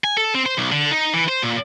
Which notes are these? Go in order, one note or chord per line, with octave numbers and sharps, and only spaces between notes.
G#5
A4
C4
C5
B1
D3
D#4
E3
C5
A#2